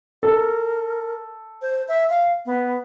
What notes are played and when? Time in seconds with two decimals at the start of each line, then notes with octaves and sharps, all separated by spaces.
0.23 A4 A#4
1.62 C5
1.88 E5
2.10 F5
2.46 B3